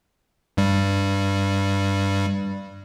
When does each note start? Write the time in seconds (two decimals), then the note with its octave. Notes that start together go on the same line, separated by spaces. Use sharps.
0.57 G2 G3